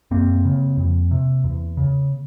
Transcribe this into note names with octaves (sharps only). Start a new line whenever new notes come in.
F#2 A#3 C4
C#3
F2
C3
E2
C#3